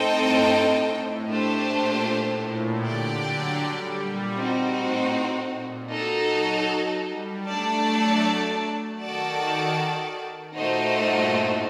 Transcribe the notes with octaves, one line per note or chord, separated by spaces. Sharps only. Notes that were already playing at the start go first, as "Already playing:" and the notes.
Already playing: A2 C4 D#4 A4 D#5 G5
G2
A2
A3 D4 G4 C5
A#2
A2
A#2
D3 G4 D5 G5
F#3
G3
A#2
C4 D#4 F#4
A2
A#2
D#4 F#4 A4
F#3
G3
A3 D4 A4 D5 A5
F#3
D#3 F#4 A4 D5 A5
A#2 A3 D#4 F#4 C5
G2
A2